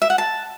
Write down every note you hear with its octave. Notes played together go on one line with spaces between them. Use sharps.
E5
F#5
A5